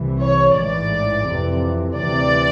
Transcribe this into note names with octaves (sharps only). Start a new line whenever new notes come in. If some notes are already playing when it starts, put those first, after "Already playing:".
Already playing: C2 C3 E3
C#5
A1 G#2 E3 D5
F2 C3 E3
D2 C3 E3 D5